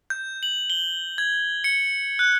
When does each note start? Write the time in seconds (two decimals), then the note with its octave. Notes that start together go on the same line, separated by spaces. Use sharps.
0.10 G6
0.43 F#7
0.70 G7
1.18 G#6
1.64 C#7
2.19 F#6